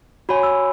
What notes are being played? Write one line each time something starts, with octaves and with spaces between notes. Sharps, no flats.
F#4 C#5 G#5 B5
E6